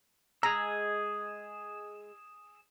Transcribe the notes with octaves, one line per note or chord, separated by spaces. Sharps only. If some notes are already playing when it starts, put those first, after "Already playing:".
G#3 G#4 A#5 E6